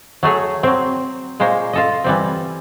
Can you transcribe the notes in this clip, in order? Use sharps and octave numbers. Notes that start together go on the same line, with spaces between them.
F#3 A3 G#4 C#5
F#3 C4
A#2 G#3 A#3 C5 C#5
F4 A4 D#5
E3 G3 C4